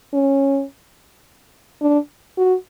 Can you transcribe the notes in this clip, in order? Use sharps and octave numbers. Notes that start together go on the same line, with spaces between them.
C#4
D4
F#4